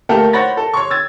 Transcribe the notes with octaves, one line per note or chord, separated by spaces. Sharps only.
A3 A#3 G4 A4 A#4
C5 C#5 F#5 B5 A6 A#6
A4
C#5 C6 C#6
E6 G#6 A6